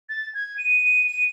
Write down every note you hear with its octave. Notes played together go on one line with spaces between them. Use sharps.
A6
G#6
D#7
D#7